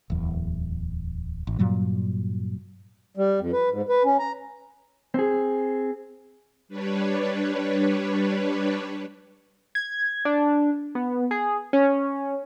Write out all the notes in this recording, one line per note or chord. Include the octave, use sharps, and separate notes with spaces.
D1 E2
A1
G2 A#2 F#3 G3
G3
F2
B4
G#2
B4
C#4
A#5
C4 G#4
G3 D4 B4 C#5
G#6
D4
B3
G#4
C#4